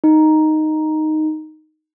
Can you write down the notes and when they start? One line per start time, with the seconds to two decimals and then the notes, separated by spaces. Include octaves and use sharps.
0.04 D#4